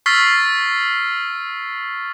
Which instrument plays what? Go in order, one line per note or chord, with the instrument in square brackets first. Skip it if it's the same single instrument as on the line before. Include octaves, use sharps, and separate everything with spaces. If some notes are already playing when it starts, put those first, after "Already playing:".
[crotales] C#6 E6 F6 A6 B6 C7